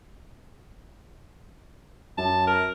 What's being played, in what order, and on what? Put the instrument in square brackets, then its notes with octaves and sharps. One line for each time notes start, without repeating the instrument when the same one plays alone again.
[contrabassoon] F#2 [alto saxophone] A5
[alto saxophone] A#4